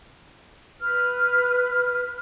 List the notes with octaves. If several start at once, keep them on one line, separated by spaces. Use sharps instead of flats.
B4 F6